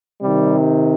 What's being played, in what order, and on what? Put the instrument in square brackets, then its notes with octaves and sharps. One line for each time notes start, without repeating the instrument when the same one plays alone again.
[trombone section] C3 D#3 G3